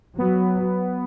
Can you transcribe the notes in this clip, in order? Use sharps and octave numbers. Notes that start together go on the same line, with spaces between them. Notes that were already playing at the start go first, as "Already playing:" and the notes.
F#3 B3